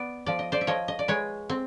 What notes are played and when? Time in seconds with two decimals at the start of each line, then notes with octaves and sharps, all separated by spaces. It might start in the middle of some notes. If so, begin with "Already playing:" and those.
Already playing: B3 D5
0.26 F3 D5
0.39 D#5
0.52 C5 D5
0.61 E5
0.67 F3 C#5 D#5
0.88 D#5
0.99 D5
1.08 G#3 B4 C#5
1.50 C4